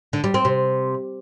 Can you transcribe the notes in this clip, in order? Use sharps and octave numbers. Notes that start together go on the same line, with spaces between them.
D3
G3
C4
C3